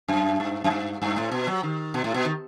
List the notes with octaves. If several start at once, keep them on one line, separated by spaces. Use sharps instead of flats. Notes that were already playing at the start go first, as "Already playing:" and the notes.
F#2
G2
F#2
G2
G2
A2
B2
F#3
D#3
B2
A2
B2
D#3